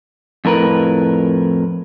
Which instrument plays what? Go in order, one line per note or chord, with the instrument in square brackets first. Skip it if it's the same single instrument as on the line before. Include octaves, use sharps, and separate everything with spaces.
[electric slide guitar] F2 A2 A#4 B4